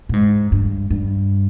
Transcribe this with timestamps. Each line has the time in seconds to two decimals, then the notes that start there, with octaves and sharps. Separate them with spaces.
0.09 A#2
0.13 G#2
0.52 G2
0.91 G2